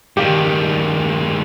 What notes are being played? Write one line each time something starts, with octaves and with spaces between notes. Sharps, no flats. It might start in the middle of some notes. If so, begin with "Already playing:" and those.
G2 D#3 G4 F5